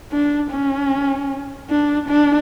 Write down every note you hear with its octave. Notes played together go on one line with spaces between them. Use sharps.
D4
C#4
D4
D4